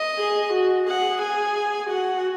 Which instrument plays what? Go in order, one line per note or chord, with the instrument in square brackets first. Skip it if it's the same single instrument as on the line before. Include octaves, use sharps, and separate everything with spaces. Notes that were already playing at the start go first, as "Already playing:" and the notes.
Already playing: [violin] D#5
[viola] G#4
F#4
[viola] G#4 [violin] F#5
[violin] G#5
[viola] F#4 [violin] F#5